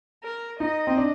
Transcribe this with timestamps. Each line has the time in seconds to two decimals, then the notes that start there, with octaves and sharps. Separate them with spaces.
0.23 A#4
0.60 D#4 D#5
0.87 C4
0.97 D4